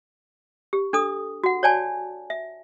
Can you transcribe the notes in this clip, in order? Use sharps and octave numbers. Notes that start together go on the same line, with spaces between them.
G4
D4 A4 D#6
F#4 F#5
C#5 D5 G#5 A5
E5